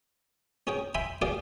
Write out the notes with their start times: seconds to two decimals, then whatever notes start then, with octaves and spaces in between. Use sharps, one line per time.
0.67 C#4 G#4 G5
0.94 E5 G5 G#5 B5 C6
1.22 G4 G#4 D5 F5 G5